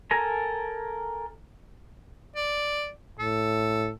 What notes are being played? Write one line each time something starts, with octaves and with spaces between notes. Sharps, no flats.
A4 A#4 G#5 A#5
D5
A2 A4